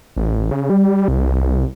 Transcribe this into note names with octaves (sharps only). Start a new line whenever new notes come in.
A1
C#3
G3
C2